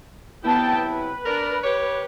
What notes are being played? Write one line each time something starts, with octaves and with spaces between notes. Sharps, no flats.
C3 F#3 B3 E4 G5 A5
B4
D4 A#4
G4 C#5